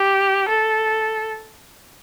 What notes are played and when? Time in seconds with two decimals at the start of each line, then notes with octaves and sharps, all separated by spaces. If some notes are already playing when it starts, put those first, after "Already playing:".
Already playing: G4
0.49 A4